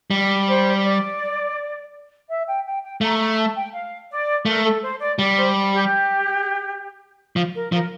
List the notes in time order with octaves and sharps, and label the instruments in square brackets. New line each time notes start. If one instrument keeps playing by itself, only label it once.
[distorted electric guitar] G3
[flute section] C5
D5
E5
G5
G5
G5
[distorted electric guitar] A3 [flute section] A#5
[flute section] A#5
A5
G5
F5
D5
[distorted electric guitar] A3 [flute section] A#4
[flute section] A4
C5
D5
[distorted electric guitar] G3 [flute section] D5
[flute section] C5
G4
[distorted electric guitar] F3
[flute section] A#4
[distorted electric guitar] F3 [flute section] A#4